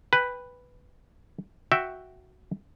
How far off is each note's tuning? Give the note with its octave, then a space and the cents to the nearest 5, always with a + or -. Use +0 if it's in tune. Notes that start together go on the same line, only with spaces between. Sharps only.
B4 +0 G5 +25
F#4 +0 E5 +0 G5 +0